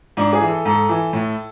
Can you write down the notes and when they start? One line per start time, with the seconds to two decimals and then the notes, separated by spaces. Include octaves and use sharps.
0.17 G#2 D4
0.33 G#4
0.41 E3
0.49 A4
0.65 G#2 A4
0.89 E3
1.13 A2